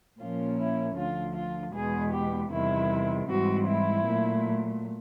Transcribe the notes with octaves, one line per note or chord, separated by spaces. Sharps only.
A#2 F3 A#3 C#4 F4
E4
D2 D3 F3 F4
F4
E2 B2 G#3 B3 G#4
G4
E2 C3 D#3 G3 E4
G#2 E3 G3 C4 F#4
E4
A#2 F#3 A3